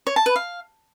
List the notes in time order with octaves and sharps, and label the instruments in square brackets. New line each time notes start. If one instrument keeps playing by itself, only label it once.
[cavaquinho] C#5
A5
B4
F5